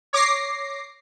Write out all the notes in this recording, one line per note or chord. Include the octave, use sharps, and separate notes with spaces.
C#5 D6 A#6 C7